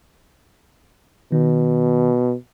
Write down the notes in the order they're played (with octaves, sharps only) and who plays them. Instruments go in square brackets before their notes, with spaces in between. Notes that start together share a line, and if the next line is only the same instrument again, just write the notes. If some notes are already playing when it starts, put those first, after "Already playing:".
[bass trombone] B2 [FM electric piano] D#3